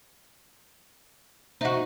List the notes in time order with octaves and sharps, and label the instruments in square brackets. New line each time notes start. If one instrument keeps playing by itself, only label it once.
[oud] D#4 F#4 [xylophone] C5 D#5 E5